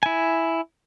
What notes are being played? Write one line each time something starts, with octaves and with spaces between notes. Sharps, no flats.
E4 G#5